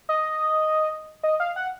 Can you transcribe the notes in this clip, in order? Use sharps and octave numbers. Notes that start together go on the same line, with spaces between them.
D#5
D#5
F5
F#5